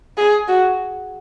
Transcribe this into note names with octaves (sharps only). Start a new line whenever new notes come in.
G#4
F#4